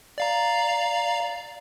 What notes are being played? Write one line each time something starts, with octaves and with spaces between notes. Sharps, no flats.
D5 F5 A#5